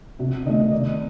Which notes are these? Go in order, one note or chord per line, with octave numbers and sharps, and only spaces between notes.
C3 F#4
D#3 A3 D#5
C3 D5